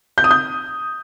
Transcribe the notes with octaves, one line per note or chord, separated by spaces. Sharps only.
G6
D#6
G6